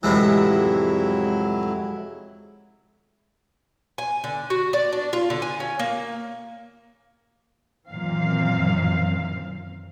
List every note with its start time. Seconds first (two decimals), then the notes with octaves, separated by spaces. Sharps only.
0.03 F2 A2 C3 E3 F#3 G#3 E4
3.98 G#5
4.24 D3
4.50 F#4
4.73 D5
4.93 D4
5.13 F4
5.30 D3
5.42 G#5
5.60 C#4
5.79 A#3
7.89 F#2 A#2 D#3 E3 C4 F5